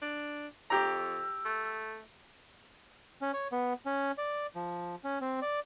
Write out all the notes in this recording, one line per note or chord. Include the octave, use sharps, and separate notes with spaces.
D4
F2 G4 A#5 E6
A3
C#4
C#5
B3
C#4
D5
F3
C#4
C4
D5